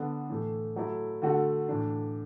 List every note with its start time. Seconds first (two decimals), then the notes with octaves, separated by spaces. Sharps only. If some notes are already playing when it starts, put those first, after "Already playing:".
Already playing: D3 B3 D4
0.30 A2 E3 A3
0.76 F#3 A3 E4
1.22 D3 A3 F#4
1.69 A2 E3 D4